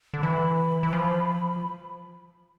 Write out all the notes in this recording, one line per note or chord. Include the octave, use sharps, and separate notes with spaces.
D3
E3 B5
E3
F3